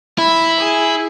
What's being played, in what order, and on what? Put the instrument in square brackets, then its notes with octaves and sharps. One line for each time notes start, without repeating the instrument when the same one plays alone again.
[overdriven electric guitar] E4 [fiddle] B5
[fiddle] G#4